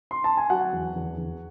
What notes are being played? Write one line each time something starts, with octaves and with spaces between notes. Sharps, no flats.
C6
A5
G#5
F#3 F#4 F#5
E2
E2
E2